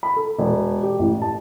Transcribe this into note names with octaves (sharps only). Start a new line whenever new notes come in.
B5
A4
E1
G4
A1
A5